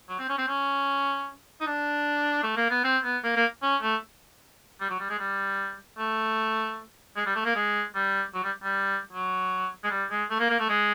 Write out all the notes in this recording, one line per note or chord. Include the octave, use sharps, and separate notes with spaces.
F#3
C4
C#4
C4
C#4
D#4
D4
A3
A#3
B3
C4
B3
A#3
A#3
C#4
A3
G3
F#3
G3
G#3
G3
A3
G#3
G3
A3
A#3
G#3
G3
F#3
G3
G3
F#3
G#3
G3
G#3
A3
A#3
A#3
A3
G#3